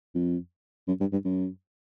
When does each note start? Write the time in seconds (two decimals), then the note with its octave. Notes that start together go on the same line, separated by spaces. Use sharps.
0.15 F2
0.88 F#2
1.00 G2
1.12 G2
1.25 F#2